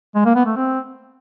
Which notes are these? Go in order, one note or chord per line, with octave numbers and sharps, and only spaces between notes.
G#3
A#3
B3
A3
C4